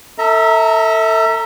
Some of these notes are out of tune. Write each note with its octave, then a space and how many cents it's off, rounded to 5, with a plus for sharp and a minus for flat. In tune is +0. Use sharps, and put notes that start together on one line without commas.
A4 +30 E5 -25 A#5 -5